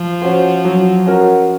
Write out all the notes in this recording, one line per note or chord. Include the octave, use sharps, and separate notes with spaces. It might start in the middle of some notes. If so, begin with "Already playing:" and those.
Already playing: F3
C#4 F#4 C5
F#3
C#4 F#4 A#4